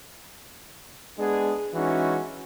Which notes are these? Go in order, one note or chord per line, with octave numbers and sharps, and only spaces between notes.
G#3 B3 D4 G#4
E3 G#3 C#4 D#4 F#4